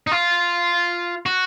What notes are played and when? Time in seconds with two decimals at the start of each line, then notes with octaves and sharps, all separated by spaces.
0.07 D#4
0.12 F4
1.26 F#4